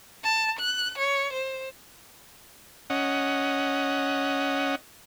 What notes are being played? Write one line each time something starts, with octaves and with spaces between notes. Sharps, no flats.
A5
F#6
C#5
C5
C#4 D#5 F#5